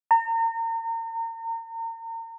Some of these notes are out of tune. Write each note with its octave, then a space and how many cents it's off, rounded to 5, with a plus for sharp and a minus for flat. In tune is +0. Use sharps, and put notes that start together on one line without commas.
A#5 -35